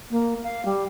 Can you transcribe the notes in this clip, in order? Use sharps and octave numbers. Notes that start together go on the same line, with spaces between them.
A#3
F5
G3